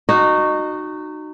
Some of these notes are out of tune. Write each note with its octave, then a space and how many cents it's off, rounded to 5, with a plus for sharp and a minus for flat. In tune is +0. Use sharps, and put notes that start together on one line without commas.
D#4 -25 F#4 +0